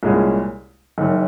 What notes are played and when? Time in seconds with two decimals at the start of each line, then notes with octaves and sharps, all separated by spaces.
0.03 C2 A#2 G#3 C#4 G#4
0.98 F#1 F#2 D#3